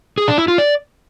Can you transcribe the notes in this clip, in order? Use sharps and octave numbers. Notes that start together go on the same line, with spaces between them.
G#4
D4
E4
F4
D5